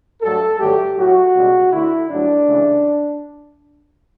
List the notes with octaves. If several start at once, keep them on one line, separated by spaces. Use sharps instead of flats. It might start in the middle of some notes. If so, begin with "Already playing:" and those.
G2 F#3 A3 A4
G2 D3 F#3 A3 G4
A2 F#3 A3 F#4
C#2 B2 G3
D2 D3 A3 E4
G2 F#3 A3 D4
C#2 C#3 E3 A3